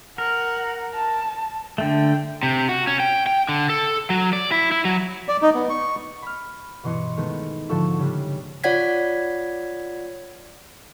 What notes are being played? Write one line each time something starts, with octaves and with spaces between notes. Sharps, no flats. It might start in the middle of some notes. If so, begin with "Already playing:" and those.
A#4 F#5
A5
D3 A3 G5
C3
F#4
C#4
G5
G5
D3
A4
F#3
D5
E4
E4
F#3
D5
D#4
B3
C#6
B5 F6
G2 B2 E3 D#5 C6 C#7
D#3 G#3 A3 B3
G#2 D3 F3 A4 E5 C#6
C#3 G3 G#3 D4
F4 C#5 D5 F#5 G#6 B6